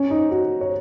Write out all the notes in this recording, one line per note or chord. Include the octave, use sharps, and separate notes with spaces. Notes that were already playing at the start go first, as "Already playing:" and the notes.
Already playing: C#4
D#4
F#4
C#5